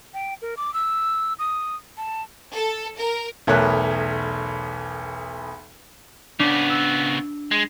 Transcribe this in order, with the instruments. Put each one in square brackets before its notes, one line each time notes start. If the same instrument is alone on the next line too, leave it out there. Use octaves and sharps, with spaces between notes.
[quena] G5
A#4
D6
E6
D#6
A5
[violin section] A4
A#4
[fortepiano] B1 E2 A3 A#4 C#5 F#6
[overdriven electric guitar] C#3 B3 [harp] D4
[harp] E6
[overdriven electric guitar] G#3